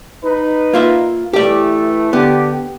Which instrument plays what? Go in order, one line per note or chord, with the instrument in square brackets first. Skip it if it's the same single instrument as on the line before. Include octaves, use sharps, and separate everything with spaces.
[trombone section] D#4 B4
[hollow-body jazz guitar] A#3 F4 E5
[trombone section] E3 A3 [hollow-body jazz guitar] G4 D5
[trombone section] D3 G4 [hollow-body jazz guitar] B3